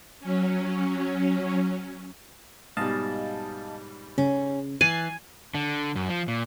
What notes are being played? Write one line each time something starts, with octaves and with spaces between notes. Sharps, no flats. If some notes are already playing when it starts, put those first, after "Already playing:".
F#3 C#4
G#2 B2 G3 D#5 F5 A5
C#3 C#4
E3 G#5 F#6 A6 C7
D3
F#2
F3
A#2